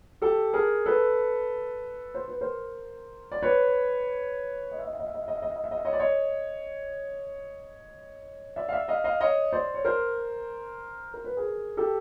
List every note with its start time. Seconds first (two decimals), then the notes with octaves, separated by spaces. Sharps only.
0.22 G4 A4
0.53 G#4 A#4
0.86 A4 B4
2.14 C5
2.28 B4
2.41 A#4 C5
3.32 D5
3.42 B4 C#5
4.71 D#5
4.78 E5
4.85 D#5
4.93 E5
4.99 D#5
5.07 E5
5.14 D#5
5.21 E5
5.28 D#5
5.35 E5
5.42 D#5
5.50 E5
5.56 D#5
5.64 E5
5.71 D#5
5.78 E5
5.85 C#5 D#5
5.93 D5
6.00 C#5 D#5
8.56 D5 E5
8.69 F5
8.72 D5 E5
8.88 D#5 F5
9.04 D#5 F5
9.21 C#5 D#5
9.53 C5 D5
9.74 C#5
9.85 A#4 C5
11.14 A#4
11.25 B4
11.37 G#4 A#4
11.77 G4 A4